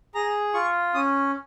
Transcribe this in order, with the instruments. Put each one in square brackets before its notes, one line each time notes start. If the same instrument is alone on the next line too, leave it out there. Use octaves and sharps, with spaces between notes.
[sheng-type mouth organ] G#4 A#5
F4 C#6
C#4 D#6